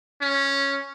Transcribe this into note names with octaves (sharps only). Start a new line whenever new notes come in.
C#4